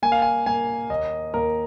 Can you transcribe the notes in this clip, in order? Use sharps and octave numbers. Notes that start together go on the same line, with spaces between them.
A#3 G#5
F5
G#5
A#3 G#5
D#2 D#5
D#2 A#4